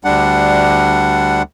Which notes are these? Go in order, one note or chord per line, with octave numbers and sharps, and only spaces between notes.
D2 G3 D4 F#5